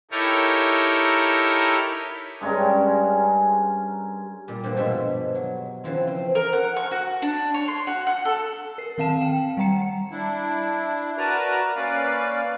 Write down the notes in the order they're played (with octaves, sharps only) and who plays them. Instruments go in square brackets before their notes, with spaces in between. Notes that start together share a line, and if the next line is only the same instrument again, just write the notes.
[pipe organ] D#4 E4 G4 A4 A#4 C#5
[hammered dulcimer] G2 G#3 C#4 A#4
[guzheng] A#2 G3
G2 A#2 F3 C4 A4 F#5
G2 B2 F3 G#3 E5
F#3
C#3 E3 F3 C4
C4
[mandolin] A#4
F#5
C#6
F#4
D4
C#5
C6
F#4
F#5
A4
[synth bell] A#4 C7
D#3 C4 F5 A5 E7
G5
G3 F#5 A#5 C#7
[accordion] D4 E4
F#4 A#4 B4 D5 A5 A#5
A#3 C#4 B4 D5 F5